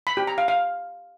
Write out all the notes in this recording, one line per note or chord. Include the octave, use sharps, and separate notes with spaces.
B5
G4
A#5
F5
F5